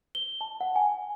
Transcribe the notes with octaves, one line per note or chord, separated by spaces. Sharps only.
G7
A5
F#5
G#5